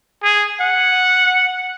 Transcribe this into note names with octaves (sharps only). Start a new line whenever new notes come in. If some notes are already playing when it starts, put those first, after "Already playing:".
G#4
F#5